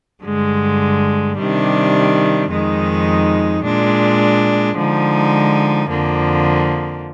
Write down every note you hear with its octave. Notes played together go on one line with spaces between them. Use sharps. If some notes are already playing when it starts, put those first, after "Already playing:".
G2 D3 G#3
C3 D#3 G3 D4
F2 D#3 G#3 D#4
A#2 G#3 D4
D3 F3 G#3 D#4
F2 D3 F3 A#3